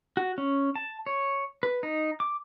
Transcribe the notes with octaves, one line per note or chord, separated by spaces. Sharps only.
F#4
C#4
A5
C#5
B4
D#4
D6